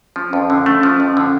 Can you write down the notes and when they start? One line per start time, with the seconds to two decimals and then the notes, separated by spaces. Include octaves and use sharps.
0.16 F3 C#4
0.33 F2
0.50 D3
0.66 A3
0.83 F3
1.00 F2
1.17 D3